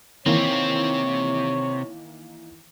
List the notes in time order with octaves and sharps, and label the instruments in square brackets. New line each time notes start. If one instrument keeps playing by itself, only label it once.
[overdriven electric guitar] C3 C4 [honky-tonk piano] D#3 E3 A#3 [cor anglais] C#5